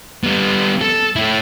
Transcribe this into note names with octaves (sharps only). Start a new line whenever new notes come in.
G3 B3
A4
A3 E4